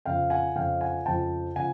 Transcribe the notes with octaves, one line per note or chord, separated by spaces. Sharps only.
F2 C#3 F3 F5 G5
F#5 G#5
F2 C#3 F3 F5 G5
F#5 G#5
F2 C#3 F3 G5 A5
C#3 F3 F#5 G#5